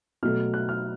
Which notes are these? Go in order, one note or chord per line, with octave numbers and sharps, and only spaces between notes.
B2 F#3 A3 F6
F#6
F6